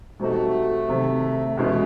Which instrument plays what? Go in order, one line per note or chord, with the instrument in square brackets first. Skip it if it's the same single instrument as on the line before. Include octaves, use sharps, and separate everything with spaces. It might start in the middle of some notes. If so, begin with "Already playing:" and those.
[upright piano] B2 G3 C4 D#4 F#4 [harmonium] A3
[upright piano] C3 D#3 F#3
[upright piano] E2 B2 G#3 C#4 E4 [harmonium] A3